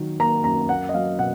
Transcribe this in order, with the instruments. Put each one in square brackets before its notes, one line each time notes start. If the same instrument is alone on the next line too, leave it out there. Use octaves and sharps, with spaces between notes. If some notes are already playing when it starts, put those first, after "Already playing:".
Already playing: [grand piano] D#3 F#3
A#3 A#5
F#2 A#5
A#3 F#5
D#5
F#3 F5
B2 F#5